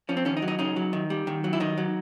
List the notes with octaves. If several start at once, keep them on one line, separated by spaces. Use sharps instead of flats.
F3 C#4
C4
D#3 C#4
D#4
F#3
D#4
C#3 D#4
F#3
D#3
G3
D#3
F#3
E4
D#3 D#4
F#3